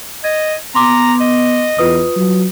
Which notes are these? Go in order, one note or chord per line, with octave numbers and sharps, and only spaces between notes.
D#5 G#6
B3 A#5 C6 D6
D#5
E2 F4 B4 D#6
F#3